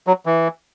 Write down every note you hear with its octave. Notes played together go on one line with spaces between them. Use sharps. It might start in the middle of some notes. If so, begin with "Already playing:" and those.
F#3
E3